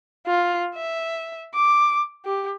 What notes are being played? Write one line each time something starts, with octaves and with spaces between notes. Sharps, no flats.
F4
E5
D6
G4